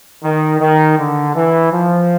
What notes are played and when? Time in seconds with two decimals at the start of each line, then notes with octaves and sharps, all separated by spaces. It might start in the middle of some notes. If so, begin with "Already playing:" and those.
0.24 D#3
0.61 D#3
0.98 D3
1.35 E3
1.72 F3